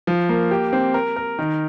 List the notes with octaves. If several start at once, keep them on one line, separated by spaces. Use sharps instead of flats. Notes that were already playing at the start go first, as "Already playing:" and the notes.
F3
A#3
G4
C4
A#4
A#4
D#3